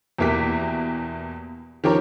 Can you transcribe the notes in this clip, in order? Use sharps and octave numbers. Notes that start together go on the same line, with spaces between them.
E2 B2 E3 A#3 G4 B6
D#3 F3 G4 A#4 C#5